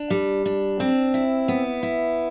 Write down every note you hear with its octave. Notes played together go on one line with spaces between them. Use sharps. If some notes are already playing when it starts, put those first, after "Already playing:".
Already playing: D4
G3
D4
C4
E4
B3
E4